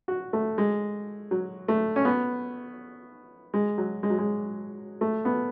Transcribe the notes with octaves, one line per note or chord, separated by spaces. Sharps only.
F#4
A3
G#3
F#3
A3
C#4
B3
G#3
F#3
G#3
F#3
G#3
A3
B3